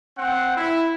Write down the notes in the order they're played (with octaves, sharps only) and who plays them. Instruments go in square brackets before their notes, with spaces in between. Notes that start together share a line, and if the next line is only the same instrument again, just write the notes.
[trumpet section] C4 F#5
E4